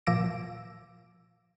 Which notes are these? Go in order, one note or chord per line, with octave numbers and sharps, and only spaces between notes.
A#2 F3 D6 E6 A#6 D7